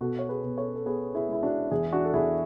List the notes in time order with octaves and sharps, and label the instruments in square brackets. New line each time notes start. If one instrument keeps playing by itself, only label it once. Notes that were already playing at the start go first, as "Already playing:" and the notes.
[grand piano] B2 F#4 A4
C#5
G#4 B4
B2
A4 C#5
A4
B3 G#4 B4
E4 G#4
G#3 E4
D4 F#4
E2 E4 G#4
D4 F#4
A4
E2 E4 G#4